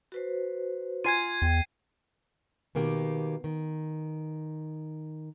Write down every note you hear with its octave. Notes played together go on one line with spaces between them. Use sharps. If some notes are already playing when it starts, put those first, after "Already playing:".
F#4 B4 C5
F4 G#5 G#6 C7 D#7
E2 G5
B2 D#3 A#3 G4
D#3